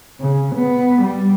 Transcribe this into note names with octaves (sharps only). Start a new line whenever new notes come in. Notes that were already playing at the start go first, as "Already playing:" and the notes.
C#3
B3
G3